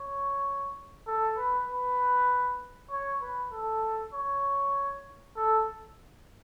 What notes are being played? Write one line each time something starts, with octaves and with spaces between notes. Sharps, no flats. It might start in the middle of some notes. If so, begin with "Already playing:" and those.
Already playing: C#5
A4
B4
B4
C#5
B4
A4
C#5
A4